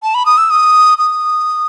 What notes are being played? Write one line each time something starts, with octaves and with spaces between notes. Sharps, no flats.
A5
B5
D#6
E6
D#6
D#6